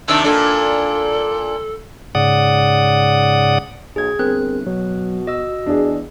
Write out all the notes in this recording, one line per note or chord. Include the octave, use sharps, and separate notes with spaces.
C3 D#3 D4 E6
A#2 D4 A4
G#2 C#3 D5 F#5 D#6
B1 G#4 G#6
G1 C4 G#4 A#4 F#6
B2 F#3
F#4 D#5 E6
E2 D4 G#4